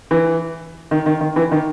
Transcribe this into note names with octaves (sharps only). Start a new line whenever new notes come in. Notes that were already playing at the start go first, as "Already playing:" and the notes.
E3
D#3
D#3
D#3
E3
D#3